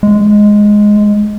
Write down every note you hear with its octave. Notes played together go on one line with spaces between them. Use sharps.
G#3